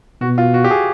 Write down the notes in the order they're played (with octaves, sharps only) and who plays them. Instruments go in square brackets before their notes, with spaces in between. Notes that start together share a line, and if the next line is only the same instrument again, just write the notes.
[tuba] B2 [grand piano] F#4
[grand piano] F4
F#4
G4
G#4